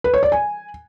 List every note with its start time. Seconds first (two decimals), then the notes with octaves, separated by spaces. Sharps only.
0.04 B4
0.14 C#5
0.23 D5
0.32 G#5